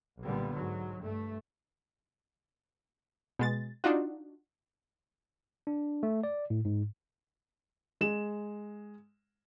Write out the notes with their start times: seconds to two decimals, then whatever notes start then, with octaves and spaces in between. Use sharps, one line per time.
0.22 B1 A#2 D3 G3 B3
0.55 G#2 F#3
1.00 G2 A3
3.39 B2 G#3 A6
3.84 D4 D#4 F4 F#4
5.67 D4
6.03 A3
6.23 D5
6.50 A2
6.65 G#2
8.01 G#3 E7